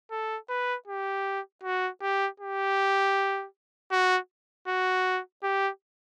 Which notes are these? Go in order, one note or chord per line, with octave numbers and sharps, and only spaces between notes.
A4
B4
G4
F#4
G4
G4
F#4
F#4
G4